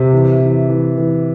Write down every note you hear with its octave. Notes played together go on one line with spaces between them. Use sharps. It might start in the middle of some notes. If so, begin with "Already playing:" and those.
Already playing: C3
E3
E3
E3
E3